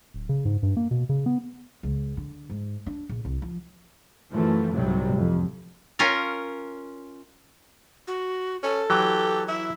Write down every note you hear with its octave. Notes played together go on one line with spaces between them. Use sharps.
D1
C#3
G#2
G2
A#3
B2
C#3
B3
C#2
D3
G#2
D4
A#1
C2
F3
F#2 E3 F3 A3
C2 G#2 C3 F#3 G3
A1 F2
C#4 F4 A#4
F#4
C#4 A4
E3 F#3 G4
E4 E5